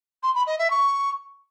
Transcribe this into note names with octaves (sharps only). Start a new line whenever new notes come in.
C6
B5
D#5
E5
C#6